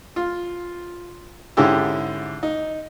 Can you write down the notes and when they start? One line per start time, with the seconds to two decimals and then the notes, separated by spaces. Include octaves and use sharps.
0.16 F4
1.57 G#2 D3 C#4 E4 G4 E6
2.43 D#4